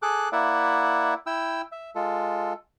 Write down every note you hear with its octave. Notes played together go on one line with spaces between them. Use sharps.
G#4 A4 D6 F#6
A#3 E4 D5 E5 F#5
E4 G5 E6
E5
G#3 F4 A4